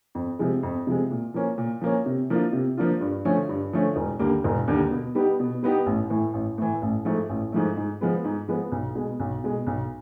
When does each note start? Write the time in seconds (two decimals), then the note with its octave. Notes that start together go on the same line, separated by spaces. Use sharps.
0.15 F2
0.39 C3 F3 G#3
0.63 F2
0.87 C3 F3 G#3
1.11 A#2
1.34 F3 A#3 C#4
1.58 A#2
1.81 F3 A#3 C#4
2.06 C3
2.30 F3 A#3 D4 F4
2.53 C3
2.77 F3 A#3 D4 F4
3.01 G2
3.25 D3 F3 A3 C#4
3.49 G2
3.73 D3 F3 A3 C#4
3.96 E1
4.19 D#2 D3 G3 A#3
4.44 E1
4.68 D#2 D3 G3 A#3
4.91 B2
5.15 G3 B3 D#4 G4
5.39 B2
5.63 G3 B3 D#4 G4
5.86 A1
6.10 A2 E3
6.33 A1
6.58 A2 E3
6.82 A1
7.05 G#2 F3 A3
7.29 A1
7.52 G#2 F3 A3
7.77 G#2
8.01 F3 G#3 B3
8.24 G#2
8.48 F3 G#3 B3
8.72 B1
8.95 B2 G#3
9.20 B1
9.44 B2 G#3
9.67 B1